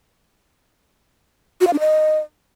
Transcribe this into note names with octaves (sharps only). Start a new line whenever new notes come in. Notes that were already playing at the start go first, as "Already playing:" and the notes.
F#4
F5
D4
D#5